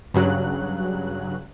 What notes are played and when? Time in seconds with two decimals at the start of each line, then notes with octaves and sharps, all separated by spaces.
0.14 G2 C#3 F#3 F#6